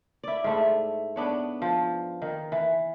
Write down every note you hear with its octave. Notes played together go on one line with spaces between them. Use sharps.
E4 D5
G#2 A3 E4
B3 D4 C#5
F3
D#3
E3